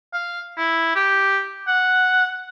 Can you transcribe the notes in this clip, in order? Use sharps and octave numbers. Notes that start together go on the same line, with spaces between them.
F5
E4
G4
F#5